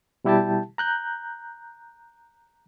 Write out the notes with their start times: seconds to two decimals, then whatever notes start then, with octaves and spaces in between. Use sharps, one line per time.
0.24 B2 G3 E4 G4 G5 A5
0.78 A#5 F#6 G6